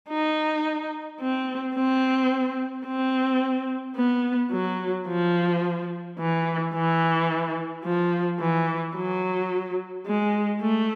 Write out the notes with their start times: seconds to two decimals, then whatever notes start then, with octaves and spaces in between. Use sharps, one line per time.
0.09 D#4
1.20 C4
1.75 C4
2.86 C4
3.96 B3
4.51 F#3
5.07 F3
6.19 E3
6.74 E3
7.84 F3
8.40 E3
8.96 F#3
10.06 G#3
10.61 A3